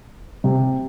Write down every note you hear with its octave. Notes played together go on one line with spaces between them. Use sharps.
C3